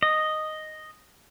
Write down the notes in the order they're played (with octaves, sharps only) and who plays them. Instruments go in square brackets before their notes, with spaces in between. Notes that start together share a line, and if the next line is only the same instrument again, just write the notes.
[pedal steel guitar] D#5